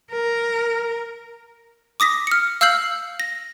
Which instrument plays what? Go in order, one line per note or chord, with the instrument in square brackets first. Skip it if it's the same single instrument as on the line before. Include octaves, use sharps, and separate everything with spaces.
[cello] A#4
[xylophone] D6 D#6 A#6 B6
F6 C#7
F5 E6 F6 G6 C7 F#7
A#6